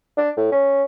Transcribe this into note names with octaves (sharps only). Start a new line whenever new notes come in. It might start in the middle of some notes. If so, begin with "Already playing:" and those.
D4
A2
C#4